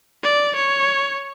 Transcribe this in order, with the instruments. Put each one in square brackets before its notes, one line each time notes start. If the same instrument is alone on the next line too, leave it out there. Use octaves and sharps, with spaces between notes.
[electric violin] D5
C#5